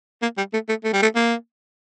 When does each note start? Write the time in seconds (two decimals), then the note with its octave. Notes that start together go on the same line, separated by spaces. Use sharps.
0.22 A#3
0.37 G3
0.53 A3
0.69 A3
0.84 A3
0.93 G3
1.02 A3
1.16 A#3